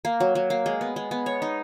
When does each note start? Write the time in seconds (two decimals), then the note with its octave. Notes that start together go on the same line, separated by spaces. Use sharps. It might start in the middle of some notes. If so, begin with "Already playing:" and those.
0.05 A#3
0.20 F#3
0.35 F#3
0.50 A#3
0.66 G#3
0.81 B3
0.96 G#3
1.11 B3
1.26 C#5
1.42 D#4